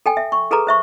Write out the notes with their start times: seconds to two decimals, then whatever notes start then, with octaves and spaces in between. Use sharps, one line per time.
0.06 A4 G5 G#5
0.17 E5
0.32 C#6
0.51 G#4 A4 B4 A#5 D6
0.67 C5 E5 C#6